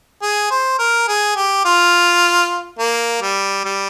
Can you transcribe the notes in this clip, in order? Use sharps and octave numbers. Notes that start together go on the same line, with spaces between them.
G#4
C5
A#4
G#4
G4
F4
A#3
G3
G3